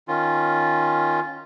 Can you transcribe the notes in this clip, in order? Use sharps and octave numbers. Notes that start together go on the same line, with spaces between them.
D#3 C#4 F4